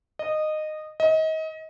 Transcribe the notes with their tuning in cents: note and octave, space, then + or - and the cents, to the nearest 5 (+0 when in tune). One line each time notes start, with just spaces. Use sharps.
D#5 -15
D#5 +30